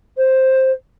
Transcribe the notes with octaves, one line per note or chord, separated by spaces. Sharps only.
C5